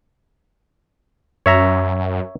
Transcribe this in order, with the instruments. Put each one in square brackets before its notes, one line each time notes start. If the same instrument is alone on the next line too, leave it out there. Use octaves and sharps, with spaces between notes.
[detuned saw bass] F#2 [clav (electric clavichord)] C#5 E5 A#5